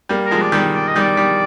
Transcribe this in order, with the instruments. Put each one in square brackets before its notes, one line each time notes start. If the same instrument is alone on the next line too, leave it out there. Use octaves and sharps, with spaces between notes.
[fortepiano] G3 A#3
[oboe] A#4
[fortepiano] F3 G#3
[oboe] D5
[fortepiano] D#3 G3
[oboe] D5
D#5
[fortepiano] D#3 G3
[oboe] D5
[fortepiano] D#3 G3